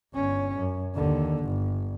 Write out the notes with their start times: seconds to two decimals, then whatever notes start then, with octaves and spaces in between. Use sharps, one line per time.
0.14 G1 C#4
0.59 F#2
0.95 D#2 D3
1.44 G1